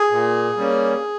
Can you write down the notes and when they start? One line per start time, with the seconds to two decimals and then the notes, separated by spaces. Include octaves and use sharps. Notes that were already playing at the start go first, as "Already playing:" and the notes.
Already playing: G#4
0.12 A#2
0.57 G3 A#3 C#4